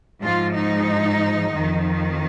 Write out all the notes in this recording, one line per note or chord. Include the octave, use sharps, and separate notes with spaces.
G#2 F3 F4
D#4
F2 D#3